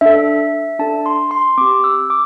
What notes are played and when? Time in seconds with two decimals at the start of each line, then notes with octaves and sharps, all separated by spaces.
0.01 D4 A4 E5
0.79 D4 A4 A5
1.06 C6
1.31 C6
1.57 C4 G4 D6
1.84 E6
2.10 D6